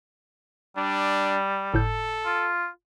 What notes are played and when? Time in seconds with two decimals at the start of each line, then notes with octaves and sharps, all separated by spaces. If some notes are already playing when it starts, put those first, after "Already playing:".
0.77 G3 D4
1.74 G1 A2 A4 G6
2.25 F4